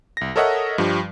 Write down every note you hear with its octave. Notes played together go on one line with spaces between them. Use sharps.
C2 A#6
A4 A#4 C#5 D#5 E5 F#5
G2 F3 G3